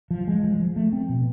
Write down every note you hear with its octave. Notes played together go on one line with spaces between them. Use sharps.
F3
G#3
F3
F3
A3
C4
B2